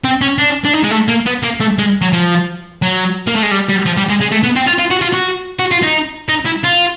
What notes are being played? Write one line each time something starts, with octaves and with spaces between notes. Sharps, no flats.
C4
C#4
D4
D4
D#4
G#3
A3
A#3
B3
A#3
A3
G#3
F#3
F3
F#3
A#3
A3
G#3
G3
G3
F3
G3
G#3
G#3
A3
B3
C4
F4
F4
F#4
F4
F#4
F#4
F4
D#4
D#4
E4
F4